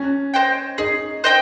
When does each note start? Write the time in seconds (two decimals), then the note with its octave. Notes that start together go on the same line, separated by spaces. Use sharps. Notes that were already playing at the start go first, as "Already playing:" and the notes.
Already playing: C#4
0.34 C5 D#5 G5
0.78 D#4 G#4
1.24 C5 D#5 G5